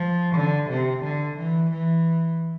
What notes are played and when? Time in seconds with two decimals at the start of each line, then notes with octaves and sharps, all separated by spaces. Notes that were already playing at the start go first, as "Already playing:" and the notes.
Already playing: F3
0.36 D3
0.70 C3
1.03 D3
1.38 E3
1.71 E3